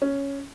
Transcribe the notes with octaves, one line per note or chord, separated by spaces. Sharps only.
C#4